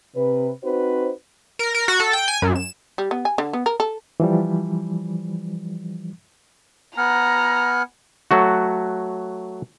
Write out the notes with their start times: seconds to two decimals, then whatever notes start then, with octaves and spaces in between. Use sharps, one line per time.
0.15 C3 B4
0.64 C4 D#4 F#4 B4 C5
1.59 A#4
1.75 A#4
1.88 F#4
2.00 A4
2.13 G5
2.28 G#5
2.42 F#2
2.56 E7
2.98 G3
3.11 B3
3.25 G#5
3.38 D3
3.53 B3
3.66 A#4
3.80 A4
4.20 E3 F3 G3
6.97 B3 F#5 G#5 A#5 F6
8.31 F#3 A3 F#4